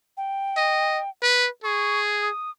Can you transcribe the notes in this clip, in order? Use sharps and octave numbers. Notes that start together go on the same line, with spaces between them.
G5
D#5
B4
G#4 C#6
D#6